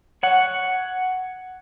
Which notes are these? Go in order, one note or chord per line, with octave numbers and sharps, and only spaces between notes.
C#5 F#5